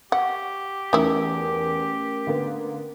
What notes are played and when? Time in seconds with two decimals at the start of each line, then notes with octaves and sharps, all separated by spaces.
0.12 G4 F#5 C#6
0.93 E2 A3 C#4 D#4 E4 A#4
2.27 D3 A#3 B3